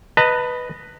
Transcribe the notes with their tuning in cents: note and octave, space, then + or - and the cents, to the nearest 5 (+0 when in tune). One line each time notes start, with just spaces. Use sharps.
B4 +0 D#5 +0 A5 +45